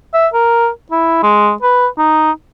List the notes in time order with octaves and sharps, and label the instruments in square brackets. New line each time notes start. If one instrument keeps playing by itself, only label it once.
[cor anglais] E5
A#4
E4
G#3
B4
D#4